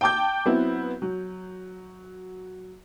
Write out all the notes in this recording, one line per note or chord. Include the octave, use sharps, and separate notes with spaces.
G5 A5 D6 G6
F#3 B3 C4 E4
F#3